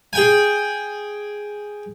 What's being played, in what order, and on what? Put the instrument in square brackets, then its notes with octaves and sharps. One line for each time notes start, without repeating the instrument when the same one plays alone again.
[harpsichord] G#4 G5 G#5